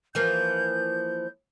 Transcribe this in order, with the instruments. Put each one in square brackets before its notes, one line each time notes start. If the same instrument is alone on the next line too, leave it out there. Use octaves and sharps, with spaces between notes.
[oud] E3 F3 A#3 [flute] G6